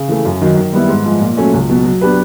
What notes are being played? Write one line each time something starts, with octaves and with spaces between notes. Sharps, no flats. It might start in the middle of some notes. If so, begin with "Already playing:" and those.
Already playing: C#3
E3 A3
F#2
D#3 F#3
D#3
G3 B3 E4
G#2
F3 G#3
A#2
F#3 A3 C#4
C#2
B2 F#3
F#3
B3 D4 G4 B4